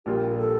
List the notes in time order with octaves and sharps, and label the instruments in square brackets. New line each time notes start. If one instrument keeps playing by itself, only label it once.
[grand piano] A#1 A#2 G3 A#3 F4 [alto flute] G4
[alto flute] A#4
A4